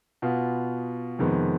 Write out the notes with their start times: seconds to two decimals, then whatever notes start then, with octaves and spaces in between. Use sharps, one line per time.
0.22 B2 B3 F4
1.19 F2 C3 D#3 G#3 B3